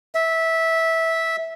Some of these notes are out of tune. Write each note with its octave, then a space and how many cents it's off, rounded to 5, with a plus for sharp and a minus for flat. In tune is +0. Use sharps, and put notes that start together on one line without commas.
E5 -15